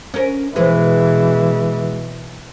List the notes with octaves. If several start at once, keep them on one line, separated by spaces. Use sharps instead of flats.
C#4 A#4
B2 E3 G#3 B4